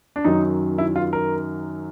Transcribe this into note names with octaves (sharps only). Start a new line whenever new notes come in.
D4
F#2 D#3 F#3 D#4
E4
F4
A#4